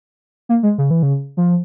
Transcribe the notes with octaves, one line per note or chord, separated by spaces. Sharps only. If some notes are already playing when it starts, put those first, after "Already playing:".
A#3
G#3
C#3
E3
C#3
F3